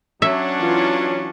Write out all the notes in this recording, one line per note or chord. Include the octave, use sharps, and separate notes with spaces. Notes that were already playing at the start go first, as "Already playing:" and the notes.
F#3 C#4 D4 E5
E3 F4